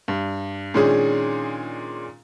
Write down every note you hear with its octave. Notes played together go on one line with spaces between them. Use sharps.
G2
A#2 D#3 G#3 C#4 D4 G#4